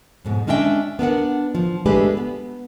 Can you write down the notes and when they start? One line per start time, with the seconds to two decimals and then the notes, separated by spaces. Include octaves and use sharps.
0.25 F2 G#2 B2
0.47 G#3 C#4 D4 E4 E5 G5
0.99 B3 D4 A#4 F#5
1.55 F3
1.86 G#3 A3 D4 G4 G#4 B4
2.17 B3